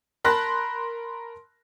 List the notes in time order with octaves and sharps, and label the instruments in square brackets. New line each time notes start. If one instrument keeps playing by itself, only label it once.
[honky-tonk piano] A#4 A5 B5 C6 F#6 A#6